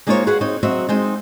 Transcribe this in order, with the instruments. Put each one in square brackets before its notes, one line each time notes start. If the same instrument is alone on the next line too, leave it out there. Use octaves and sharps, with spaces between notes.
[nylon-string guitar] G#3 A#3 D#4 F4 C5 C#5
F#4 G#4 B4 F5 F#5
C4 D#4 C#5
F#3 C4 F#4 D#5 E5
G#3 C4 D#4